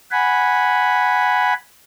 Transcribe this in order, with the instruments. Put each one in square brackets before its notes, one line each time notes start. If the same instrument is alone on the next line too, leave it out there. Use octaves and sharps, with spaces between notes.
[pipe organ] F#5 G#5 B5